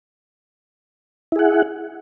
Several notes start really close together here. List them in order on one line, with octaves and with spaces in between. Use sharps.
E4 G#4 F#5